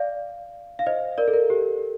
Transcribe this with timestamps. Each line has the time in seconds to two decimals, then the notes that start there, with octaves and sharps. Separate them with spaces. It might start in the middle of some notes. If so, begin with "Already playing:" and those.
Already playing: D5 F5
0.79 F5
0.86 C5 D#5
1.18 A#4 D5
1.28 A4
1.34 A#4
1.50 G4